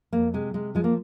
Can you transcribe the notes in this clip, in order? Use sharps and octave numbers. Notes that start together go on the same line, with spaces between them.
F2 A#3
C3 G#3
C3 G#3
F3 G#3
A#3